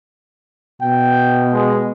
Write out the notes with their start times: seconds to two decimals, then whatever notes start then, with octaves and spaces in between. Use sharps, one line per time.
0.82 B2 G5
1.53 G#3